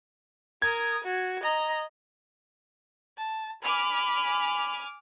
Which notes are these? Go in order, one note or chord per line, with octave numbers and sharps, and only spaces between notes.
A#4 D#6 G#6
F#4
D#5 A#5
A5
G#5 B5 D6 F6